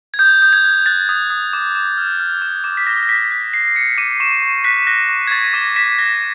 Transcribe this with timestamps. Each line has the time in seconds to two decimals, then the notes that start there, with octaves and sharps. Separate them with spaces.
0.14 G#6
0.19 D#6 G6
0.42 D#6 G6
0.53 G#6
0.64 F#6
0.86 F#6 A6
1.09 D#6
1.30 D#6
1.53 D6
1.75 D6
1.98 F6
2.20 F6
2.42 D6
2.64 D6
2.77 B6
2.87 D6 A#6
3.03 A#6
3.09 D6 B6
3.31 F#6 B6
3.53 F#6 C7
3.75 D6 C#7
3.98 D6 D#7
4.20 C#6 E7
4.42 C#6
4.64 F#6 B6
4.87 F#6 A#6
5.09 C#6
5.27 G#6
5.31 C#6 A6
5.54 D6 A#6
5.76 D6 B6
5.98 F#6 A#6